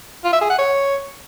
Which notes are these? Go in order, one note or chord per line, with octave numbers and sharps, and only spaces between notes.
F4
E5
G#4
F#5
C#5